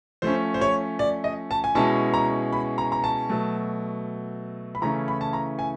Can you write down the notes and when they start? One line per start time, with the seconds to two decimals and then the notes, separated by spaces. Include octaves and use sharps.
0.22 F3 A3 C#4 C5
0.54 C5
0.61 C#5
0.99 D5
1.24 D#5
1.51 A5
1.64 G#5
1.75 B2 G#3 C#4 E4 A5
2.14 A#5
2.53 B5
2.78 A#5
2.92 A#5
3.04 A5
3.30 B2 F#3 A3
4.75 B5
4.82 C#3 E3 A3 C#4 E4 A#5
5.08 B5
5.21 A5
5.33 A#5
5.59 G#5